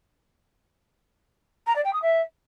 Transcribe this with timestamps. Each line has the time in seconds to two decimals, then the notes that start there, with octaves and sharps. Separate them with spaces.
1.66 A#5
1.75 D5
1.84 G5
1.93 D#6
2.02 E5